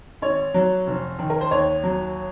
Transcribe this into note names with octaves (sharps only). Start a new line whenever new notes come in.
G#1 C#5
F#3
F1
D#3
A#4
C5
D#2 C#5
F#3